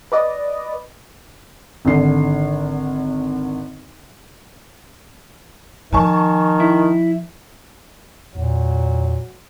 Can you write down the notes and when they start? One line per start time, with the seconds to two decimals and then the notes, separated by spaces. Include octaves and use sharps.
0.12 B4 D5 D#5
1.85 G#1 D3 C7
5.93 D#3 F3 G#5 A5 C#6
6.60 E4
8.35 E2 A#2 F#3